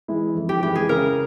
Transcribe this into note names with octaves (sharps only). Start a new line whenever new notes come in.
E3 G#3 E4
F2
G4
E3 G#3 E4 G4
G#4
C#3 A#4